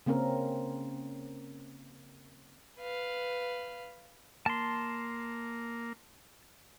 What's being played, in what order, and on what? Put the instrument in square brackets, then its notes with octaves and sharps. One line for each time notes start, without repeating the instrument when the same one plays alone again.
[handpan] C#3 A#3 C4 C#4 A#4
[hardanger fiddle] B4 F5
[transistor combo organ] A#3 [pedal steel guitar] A5 C6